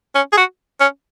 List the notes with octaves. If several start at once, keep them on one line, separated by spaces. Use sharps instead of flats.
C#4
G#4
F#4
C#4